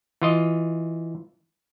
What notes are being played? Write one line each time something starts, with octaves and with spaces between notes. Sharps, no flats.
E3 F4 D#5